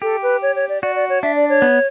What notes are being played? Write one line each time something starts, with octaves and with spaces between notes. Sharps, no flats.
G4 A4
B4
C#5
C#5
D5
F#4 D5
D5
C#5
D4 E5
D5
C#5
B3